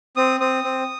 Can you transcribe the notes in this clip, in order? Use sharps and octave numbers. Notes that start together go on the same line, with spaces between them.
C4 D#6
C4 D#6
C4